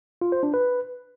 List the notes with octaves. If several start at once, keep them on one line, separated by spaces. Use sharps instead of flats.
F4
C5
D4
B4